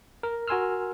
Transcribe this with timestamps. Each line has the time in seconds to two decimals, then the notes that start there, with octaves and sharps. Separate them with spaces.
0.23 A#4
0.48 F#4 A#4 G#5 C6 E6 F6